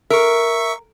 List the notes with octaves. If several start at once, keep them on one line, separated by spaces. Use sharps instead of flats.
A#4 E5 C#6